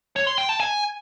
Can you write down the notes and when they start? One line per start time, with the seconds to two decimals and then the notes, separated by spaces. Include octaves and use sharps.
0.16 C#5
0.27 C6
0.38 G5
0.49 A5
0.60 G#5